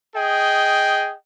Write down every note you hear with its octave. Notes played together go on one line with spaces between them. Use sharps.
G#4 D#5 G5